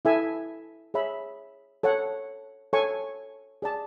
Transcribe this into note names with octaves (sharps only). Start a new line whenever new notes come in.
E4 A4 E5 G#5
G#4 C#5 E5 B5
A4 C#5 F#5
A4 C#5 G#5 C#6
G#4 D5 A5